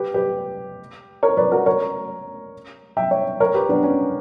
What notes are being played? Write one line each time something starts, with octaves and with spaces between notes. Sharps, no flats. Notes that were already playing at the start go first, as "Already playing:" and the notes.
Already playing: G4 B4
G4 B4
A#4 C#5
B4 D5
F#4 A#4
A#4 C#5
E5 G5
C#5 E5
A#4 C#5
G4 B4
B3 D4
C#4